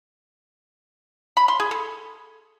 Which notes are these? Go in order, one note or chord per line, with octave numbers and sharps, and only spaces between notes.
B5
C6
G#4
A4